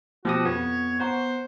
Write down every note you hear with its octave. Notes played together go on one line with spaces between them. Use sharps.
B2 F3 F#4 G4 D#6
F2 B3 C#5
C5 F#5 A#5 C#6